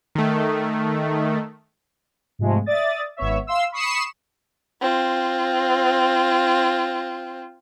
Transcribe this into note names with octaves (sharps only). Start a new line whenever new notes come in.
D#3 A3
G#2 C3 F3 G#3 A3
D5 E5 D#6 A6
G#1 B3 C#5 E5
F5 C6 E6
B5 C#6 D#6 C7 C#7 E7
C4 F4